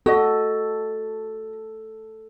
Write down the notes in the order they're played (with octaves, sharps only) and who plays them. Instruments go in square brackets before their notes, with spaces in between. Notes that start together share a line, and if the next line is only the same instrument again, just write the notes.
[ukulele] F#4 D#5 [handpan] A4